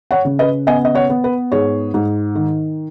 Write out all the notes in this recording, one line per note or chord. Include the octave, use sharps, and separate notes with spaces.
C#5 F#5
C#3
B4 D#5
B3 D#5 G#5
D#5
C#5 F#5
B3
B4
G#2 G#4 C#5
G#2
D#3